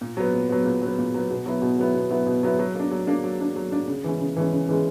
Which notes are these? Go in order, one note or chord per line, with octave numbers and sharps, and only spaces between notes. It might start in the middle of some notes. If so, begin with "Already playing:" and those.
A#2
F#3 B3
A#2
F#3 B3
A#2
F#3 B3
A#2
F#3 B3
B2
F#3 B3 E4
B2
F#3 B3 E4
B2
F#3 B3 E4
B2
F#3 B3 E4
F#3
A#3 D4
F#3
A#3 D4
F#3
A#3 D4
F#3
A#3 D4
C#3
E3 G#3 C#4
C#3
E3 G#3 C#4
C#3
E3 G#3 C#4